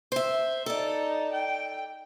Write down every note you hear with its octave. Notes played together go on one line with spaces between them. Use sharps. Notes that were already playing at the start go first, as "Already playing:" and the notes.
C5 E5
D#4 A4 D5
G5